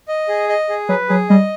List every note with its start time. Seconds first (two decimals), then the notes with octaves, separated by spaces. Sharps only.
0.08 D#5
0.28 G#4
0.49 D#5
0.69 G#4
0.89 F#3 B4
1.09 F#3 G#4
1.30 G3 D#5